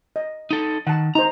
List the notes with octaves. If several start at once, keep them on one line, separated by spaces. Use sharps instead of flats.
D#5
D#4 A4
D#3 F#5 A5
D#4 C5 A#5